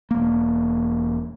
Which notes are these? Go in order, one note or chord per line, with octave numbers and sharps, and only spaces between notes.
E1 A#3